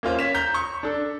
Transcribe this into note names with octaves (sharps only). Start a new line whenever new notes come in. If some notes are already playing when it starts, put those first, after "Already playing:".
A#3 C#4 F4 C5
C#5 B6 E7
A#5 G6 B6
C#6
D4 A4